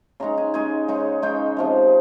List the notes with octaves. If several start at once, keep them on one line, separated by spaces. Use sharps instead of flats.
C#3 G#3 D#4 A#5
G#5
C#3 G#3 D#4 G#5
C#3 G#3 D#4
C#3 G#3 D#4 G5
C3 F3 G#3